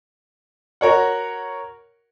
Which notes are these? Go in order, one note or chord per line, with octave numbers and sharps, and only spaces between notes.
F#4 A#4 C#5 F#5